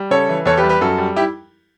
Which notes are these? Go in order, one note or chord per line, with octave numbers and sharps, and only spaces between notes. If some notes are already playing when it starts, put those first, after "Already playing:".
Already playing: G3
C#3 A4 C#5
E3
E2 A4 C#5
G4 B4
G3
G4 B4
F#2 F#4 A4
G3
E4 G4